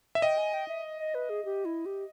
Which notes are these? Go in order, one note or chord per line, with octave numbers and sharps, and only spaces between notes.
E5
D#5 G5
G#5
G5
E5
D#5
B4
G#4
G4
E4
G4